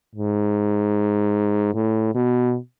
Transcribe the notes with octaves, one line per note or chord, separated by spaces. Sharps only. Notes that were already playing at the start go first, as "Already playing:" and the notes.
G#2
A2
B2